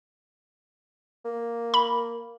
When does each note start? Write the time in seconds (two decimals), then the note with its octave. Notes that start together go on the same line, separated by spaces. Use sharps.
1.25 A#3
1.74 B5